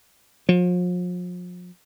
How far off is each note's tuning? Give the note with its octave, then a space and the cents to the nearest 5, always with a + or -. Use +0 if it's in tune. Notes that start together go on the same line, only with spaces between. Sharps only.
F3 +40